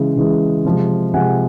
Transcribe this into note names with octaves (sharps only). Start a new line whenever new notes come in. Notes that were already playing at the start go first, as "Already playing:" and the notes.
Already playing: C#3 E3 G#3
C#3 E3 G#3
C3 F3 G#3
C3 F3 G#3 F#5 G#5